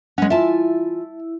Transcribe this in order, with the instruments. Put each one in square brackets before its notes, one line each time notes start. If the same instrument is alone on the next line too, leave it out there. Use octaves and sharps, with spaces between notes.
[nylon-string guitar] G#3 C#4 [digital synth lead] F#5
[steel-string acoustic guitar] E3 F4 G#5 [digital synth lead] E4 [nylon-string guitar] E5 A5